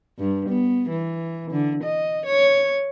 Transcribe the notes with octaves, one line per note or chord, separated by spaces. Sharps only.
G2
B3
E3
D3
D#5
C#5